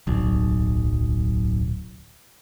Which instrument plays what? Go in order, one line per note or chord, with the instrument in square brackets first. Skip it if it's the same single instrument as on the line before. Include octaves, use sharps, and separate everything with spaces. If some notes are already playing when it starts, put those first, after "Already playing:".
[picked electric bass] D1 B1